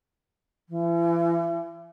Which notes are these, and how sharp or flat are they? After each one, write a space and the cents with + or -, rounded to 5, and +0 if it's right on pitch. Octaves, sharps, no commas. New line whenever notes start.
E3 +40